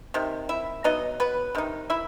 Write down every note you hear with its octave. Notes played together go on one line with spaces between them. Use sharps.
C3 D#3
E4 E5
F#3 B3 D#4 D#5
B3 B4
C3 D#3 D#4
E4 E5